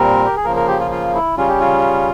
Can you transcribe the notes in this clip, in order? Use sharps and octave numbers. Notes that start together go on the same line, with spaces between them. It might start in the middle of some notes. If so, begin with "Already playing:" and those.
Already playing: A#2 G3 C4 A#4
G4
G#4
C#3 F3 A#3 A#4
A#4
G4
F4
F4
E4
C#3 G3 C#4 F4
G4
F4